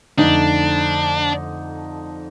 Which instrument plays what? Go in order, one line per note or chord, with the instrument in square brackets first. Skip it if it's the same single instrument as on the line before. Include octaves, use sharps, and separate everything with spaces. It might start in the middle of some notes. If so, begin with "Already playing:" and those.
[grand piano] F2 D3 A3 D#4 [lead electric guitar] D4